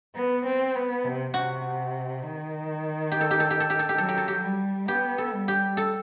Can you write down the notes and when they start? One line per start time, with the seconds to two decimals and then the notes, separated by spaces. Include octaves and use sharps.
0.15 B3
0.45 C4
0.75 B3
1.04 C3
1.34 C3 F#4
2.23 D#3
3.12 G4
3.21 A4
3.31 G4
3.40 A4
3.50 G4
3.60 A4
3.70 G4
3.79 A4
3.89 G4
3.98 F#3 A4
4.09 G4
4.18 A4
4.28 G4
4.44 G3
4.88 B3 G4
5.18 A4
5.33 G3
5.48 G4
5.77 A4